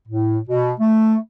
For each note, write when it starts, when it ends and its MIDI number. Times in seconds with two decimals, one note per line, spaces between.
0.08 0.39 45
0.48 0.73 47
0.80 1.17 57